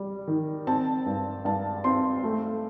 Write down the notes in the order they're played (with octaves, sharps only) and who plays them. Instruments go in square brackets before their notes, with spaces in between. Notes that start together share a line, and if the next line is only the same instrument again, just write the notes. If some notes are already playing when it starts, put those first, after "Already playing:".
Already playing: [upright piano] G3
D#3
C4 A5
G2
G2 A5
C4 C6
A3